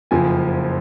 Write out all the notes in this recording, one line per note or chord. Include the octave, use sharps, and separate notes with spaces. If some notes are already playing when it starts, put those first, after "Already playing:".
F#1 F2 F3 G#5